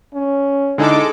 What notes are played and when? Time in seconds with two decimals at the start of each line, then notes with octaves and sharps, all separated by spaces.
0.14 C#4
0.78 D3 G#3 D#4 E4 A4 D6